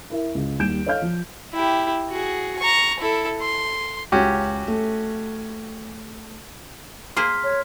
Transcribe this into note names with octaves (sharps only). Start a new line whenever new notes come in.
E4 A#4 E5
C#2
D#2 G3 G6 D7 E7
A4 C#5 D#5 F5 F6 G6
F3
E4 G4
F#4 G#4
A#5 C#6
E4 A4
C6
C#2 C#4 F#4 G4
A3
A#3 G#4 C5 C6 F6 B6
C#5